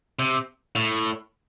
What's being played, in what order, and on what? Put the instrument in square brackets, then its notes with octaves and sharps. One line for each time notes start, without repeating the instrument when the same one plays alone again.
[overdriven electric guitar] C3
A2